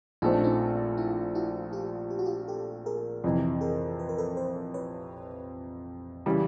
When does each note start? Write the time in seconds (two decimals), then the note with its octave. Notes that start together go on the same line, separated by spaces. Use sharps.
0.22 A#1 A#2 F3 A3 C4 D#4
0.33 D4
0.44 C#4 D#4
0.97 D4 E4
1.35 E4 F#4
1.73 F4 G4
2.10 G4
2.19 F#4
2.25 F4 G4
2.48 G4 A4
2.86 G#4 A#4
3.24 F2 C3 E3
3.61 G#4 A#4
3.99 B4
4.09 A#4
4.18 A4 B4
4.37 A#4 C5
4.74 B4 C#5
6.26 C#3 E3 G3